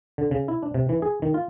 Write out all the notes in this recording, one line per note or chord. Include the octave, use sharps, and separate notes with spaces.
D3
C#3
E4
D4
C3
E3
G#4
D#3
F4